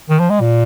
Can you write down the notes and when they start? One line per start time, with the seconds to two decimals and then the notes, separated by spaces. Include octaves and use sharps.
0.10 D#3
0.19 F3
0.30 G#3
0.41 A#2